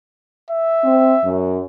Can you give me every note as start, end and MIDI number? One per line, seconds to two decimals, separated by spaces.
0.50 1.41 76
0.84 1.16 60
1.24 1.62 42